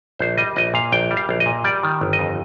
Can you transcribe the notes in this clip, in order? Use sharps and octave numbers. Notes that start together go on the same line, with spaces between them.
A#1 C5
G3 D#5
A#1 D#5
A#2 F5
A#1 G5
G3
F5
A#1
D#5
A#2
G3 D5
D#3
G1
D#5
F2